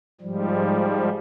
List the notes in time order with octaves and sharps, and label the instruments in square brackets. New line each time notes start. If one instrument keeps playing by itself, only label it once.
[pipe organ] G#2 F3 G3